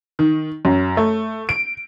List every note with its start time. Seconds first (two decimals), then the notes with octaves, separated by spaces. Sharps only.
0.19 D#3
0.65 F#2
0.97 A3
1.49 D7